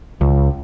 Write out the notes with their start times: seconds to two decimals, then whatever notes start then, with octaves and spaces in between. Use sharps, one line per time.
0.21 C#2